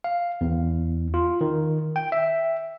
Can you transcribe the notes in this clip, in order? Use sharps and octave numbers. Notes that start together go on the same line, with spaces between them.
F5
E2
F4
D#3
G5
E5